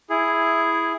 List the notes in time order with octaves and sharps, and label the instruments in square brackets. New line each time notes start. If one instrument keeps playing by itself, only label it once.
[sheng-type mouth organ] E4 G#4